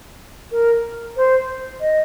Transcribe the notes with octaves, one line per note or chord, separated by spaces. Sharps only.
A#4
C5
D#5